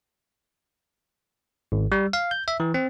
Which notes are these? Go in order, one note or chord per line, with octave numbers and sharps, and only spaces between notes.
G#1
G3
F5
G6
E5
E3
C4